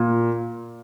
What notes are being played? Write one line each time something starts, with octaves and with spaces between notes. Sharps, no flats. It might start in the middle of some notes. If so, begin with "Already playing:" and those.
Already playing: A#2